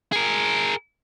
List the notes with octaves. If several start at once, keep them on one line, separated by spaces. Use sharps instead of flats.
G#4 A#4